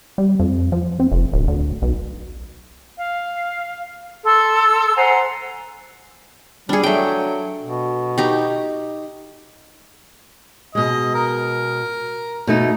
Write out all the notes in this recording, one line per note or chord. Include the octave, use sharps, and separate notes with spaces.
G3
F2
F3
C4
F1
D1
D2
B1
F5
A4 C6 E6
C5 F#5 G#5 A#5
G3 D4 G#4
F#3 A3 G5
B2
D#4 G4
B2 G#3 D#5
A#4
B2 A3 D#4